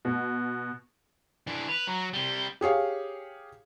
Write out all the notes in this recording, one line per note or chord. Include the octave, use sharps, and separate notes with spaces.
B2
E3 D4
B4 F7
F#3 A#5
C3 G3 G7
G4 G#4 C#5 F5